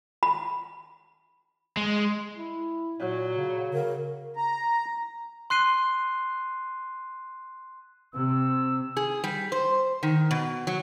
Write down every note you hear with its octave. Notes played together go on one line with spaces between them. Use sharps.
B5
G#3
E4
A#2 F#3
C#3
C#3 A#4
A#5
C6 F#6 C7 D#7 G7
C3 E6
G#4
G3
C5
D#3
B2
F#3